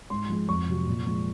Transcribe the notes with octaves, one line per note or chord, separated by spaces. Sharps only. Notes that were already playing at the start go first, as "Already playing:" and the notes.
G#2 C6
F3 G#3
F2 C#6
C3 F#3
A#2
F3 G#3